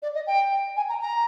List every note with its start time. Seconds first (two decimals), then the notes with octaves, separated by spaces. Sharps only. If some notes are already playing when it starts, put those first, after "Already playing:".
0.02 D5
0.15 D#5
0.27 G5
0.76 G#5
0.89 A#5
1.01 A#5